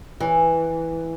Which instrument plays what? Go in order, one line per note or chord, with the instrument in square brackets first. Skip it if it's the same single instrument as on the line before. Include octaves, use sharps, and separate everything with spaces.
[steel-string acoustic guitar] E3